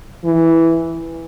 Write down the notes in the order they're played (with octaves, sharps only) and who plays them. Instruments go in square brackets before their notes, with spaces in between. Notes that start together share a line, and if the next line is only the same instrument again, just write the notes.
[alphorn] E3